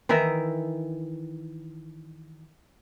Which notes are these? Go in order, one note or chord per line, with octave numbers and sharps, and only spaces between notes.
D#3 E3 A#4 E5